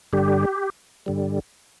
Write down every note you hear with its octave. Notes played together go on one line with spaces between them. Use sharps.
G2 D3 G3 G4
G2 D3 G3